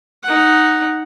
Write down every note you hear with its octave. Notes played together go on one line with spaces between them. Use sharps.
D#4 F#5